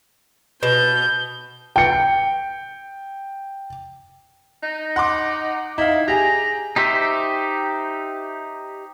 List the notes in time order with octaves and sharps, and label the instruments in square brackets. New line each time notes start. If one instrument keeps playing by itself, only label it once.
[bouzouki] B2 [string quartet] G6
[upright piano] G5 C#7
[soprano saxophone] D#4
[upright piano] F#5 C6 D6
[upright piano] D#4 F5 [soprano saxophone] E4
[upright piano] G4 G#4 [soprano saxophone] A#5
[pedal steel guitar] D#4 G4 C5 E5